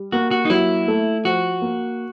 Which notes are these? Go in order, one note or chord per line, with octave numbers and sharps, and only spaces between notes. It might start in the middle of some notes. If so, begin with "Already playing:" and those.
Already playing: G3
A#3 F#4
F#4
D#4
F#3 E4
A3
F3 F#4
A#3